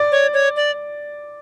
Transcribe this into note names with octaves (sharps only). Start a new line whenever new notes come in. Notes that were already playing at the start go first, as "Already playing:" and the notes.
Already playing: D5
C#5
C#5
D5